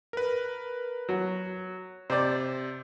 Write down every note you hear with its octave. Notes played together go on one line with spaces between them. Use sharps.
A#4 B4
F#3
C3 C5 D5